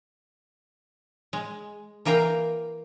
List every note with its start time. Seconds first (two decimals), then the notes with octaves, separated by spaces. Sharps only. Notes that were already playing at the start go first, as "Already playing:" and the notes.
1.33 G#3
2.05 E3 A#3 A#4 F5 G5